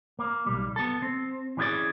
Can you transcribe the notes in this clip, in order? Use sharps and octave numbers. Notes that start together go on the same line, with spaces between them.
A#3
B1 G3
B3 A4
C4
E3 C#4 D4 G4 G#4 D5